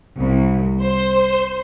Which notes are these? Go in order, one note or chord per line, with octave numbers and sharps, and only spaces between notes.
C2
C5